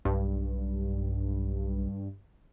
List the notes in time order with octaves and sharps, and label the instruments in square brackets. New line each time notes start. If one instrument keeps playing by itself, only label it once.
[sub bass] B1 [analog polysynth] G2